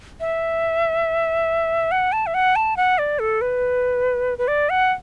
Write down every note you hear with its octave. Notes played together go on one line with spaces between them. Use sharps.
E5
F#5
A5
E5
F#5
A5
F#5
D5
A4
B4
B4
D5
F#5